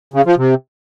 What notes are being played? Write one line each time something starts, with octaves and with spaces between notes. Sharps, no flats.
C#3
F3
C3